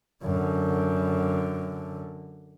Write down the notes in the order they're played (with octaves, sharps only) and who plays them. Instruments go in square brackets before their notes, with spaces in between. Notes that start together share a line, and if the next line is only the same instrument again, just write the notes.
[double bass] F#2 D3